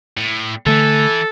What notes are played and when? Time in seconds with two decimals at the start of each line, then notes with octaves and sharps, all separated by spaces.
0.17 A2
0.66 D3 E3 A3 A4